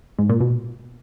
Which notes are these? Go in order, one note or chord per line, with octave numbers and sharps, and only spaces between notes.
G#2
A#2
B2